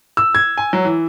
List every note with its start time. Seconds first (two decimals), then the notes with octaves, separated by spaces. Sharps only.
0.17 E6
0.35 G#6
0.57 G#5
0.73 F#3
0.85 E3